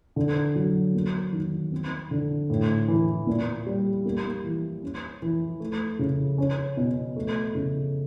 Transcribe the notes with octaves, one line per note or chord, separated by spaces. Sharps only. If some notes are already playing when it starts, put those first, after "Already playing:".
D3
F#3
A#3
D#3
C4
D3
A2
E3
A#2
G3
A#3
E3
C#4
E3
A3
C#3
C#4
B2
A3
C#3